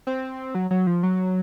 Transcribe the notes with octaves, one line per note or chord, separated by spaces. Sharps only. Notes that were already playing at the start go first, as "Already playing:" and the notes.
C4
F#3
F#3
F3
F#3